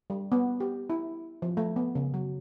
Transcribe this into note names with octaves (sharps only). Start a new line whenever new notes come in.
G3
B3
G4
E4
F3
A3
B3
C#3
F#3